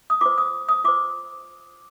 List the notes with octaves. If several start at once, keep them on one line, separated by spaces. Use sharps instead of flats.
D#6
F4 C5 D6
D#6
D#6
F4 C5 D6